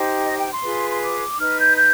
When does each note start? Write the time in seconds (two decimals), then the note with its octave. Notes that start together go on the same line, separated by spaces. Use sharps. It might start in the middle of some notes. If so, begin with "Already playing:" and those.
Already playing: D#4 G4 C5
0.25 D#5
0.37 G5
0.51 C6
0.63 F4 G#4 B4
0.89 C6
1.01 D6
1.39 D#4 B4 F6
1.58 G6
1.76 G6